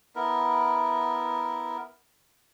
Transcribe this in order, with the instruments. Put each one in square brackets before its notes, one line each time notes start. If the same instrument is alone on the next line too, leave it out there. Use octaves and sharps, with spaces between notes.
[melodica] B3 E4 A#4